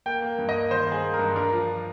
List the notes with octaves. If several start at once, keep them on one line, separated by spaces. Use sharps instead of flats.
A#3 G5
A#3
G2
D#5
A#3
D#3 C5
D#3 G#4
A#3
A#4
G2
D4 A#4
F3